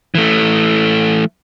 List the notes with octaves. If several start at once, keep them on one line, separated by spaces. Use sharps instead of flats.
E3 A3